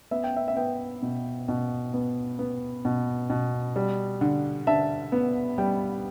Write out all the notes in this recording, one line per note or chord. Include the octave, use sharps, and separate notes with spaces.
B3 E5
G5
E5
E5
B3 G5
B2
B2
B3
B3
B2
B2
G3
D3
D3 E5 A5
B3
G3 G5